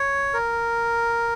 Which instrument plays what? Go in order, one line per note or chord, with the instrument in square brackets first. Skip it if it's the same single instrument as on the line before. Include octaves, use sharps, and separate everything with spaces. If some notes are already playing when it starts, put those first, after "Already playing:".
Already playing: [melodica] C#5
A#4